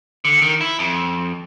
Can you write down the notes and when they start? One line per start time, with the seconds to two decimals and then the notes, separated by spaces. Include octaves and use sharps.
0.25 D3
0.42 D#3
0.61 E4
0.79 F2